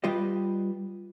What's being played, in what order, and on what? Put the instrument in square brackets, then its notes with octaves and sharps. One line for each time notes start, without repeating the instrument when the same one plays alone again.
[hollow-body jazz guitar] G3 F4 G4 B4 D#5